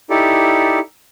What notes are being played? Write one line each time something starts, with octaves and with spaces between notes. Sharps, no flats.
D#4 E4 G4 A4 D5